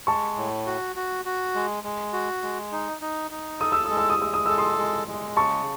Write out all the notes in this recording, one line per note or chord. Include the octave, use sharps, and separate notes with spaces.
G#3 A5 C#6
A2
F#4
F#4
F#4
G#3
G#3
F#4
G#3
D#4
D#4
D#4
A4 D#6
E6
G#3 D#6
E6
D#6
G#3 E6
D#6
A4 E6
C6 D#6
G#3
G#3
C#3 A5 C#6